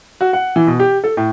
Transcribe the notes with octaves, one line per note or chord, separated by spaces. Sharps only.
F#4
F#5
E3
B2
G4
A4
A2